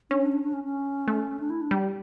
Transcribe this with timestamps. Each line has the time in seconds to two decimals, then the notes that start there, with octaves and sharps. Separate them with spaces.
0.10 C#4 D4
0.22 D4
0.32 D4
0.43 D4
0.53 C#4
0.64 C#4
1.08 A3
1.40 D4
1.50 E4
1.61 D4
1.71 G3